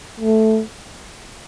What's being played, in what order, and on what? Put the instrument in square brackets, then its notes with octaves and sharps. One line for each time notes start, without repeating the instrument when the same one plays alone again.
[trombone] A3